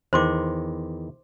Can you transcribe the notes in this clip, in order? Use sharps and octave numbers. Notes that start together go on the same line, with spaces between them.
E2 D#3 C5 C6 D6